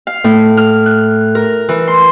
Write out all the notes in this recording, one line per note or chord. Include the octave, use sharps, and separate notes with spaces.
F5
A2
F6
F#6
A#4
E3
C6